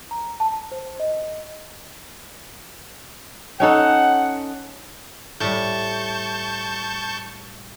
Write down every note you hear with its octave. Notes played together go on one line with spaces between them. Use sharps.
A#5
A5
C5
D#5
C#4 D#4 A4 F#5
A2 G3 A5 C#6 G6